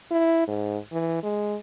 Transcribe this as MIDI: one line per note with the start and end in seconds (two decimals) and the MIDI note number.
0.11 0.43 64
0.47 0.77 44
0.92 1.21 52
1.23 1.57 56